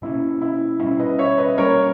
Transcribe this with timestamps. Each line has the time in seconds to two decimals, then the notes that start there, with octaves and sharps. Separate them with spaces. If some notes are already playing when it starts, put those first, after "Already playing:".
0.02 B2 A#3 C#4 E4
0.42 E4
0.80 B2 G3 C#4 E4
1.00 B4 D#5
1.18 C#5 E5
1.38 B4 D#5
1.57 B2 G3 A#3 C#4 A#4 C#5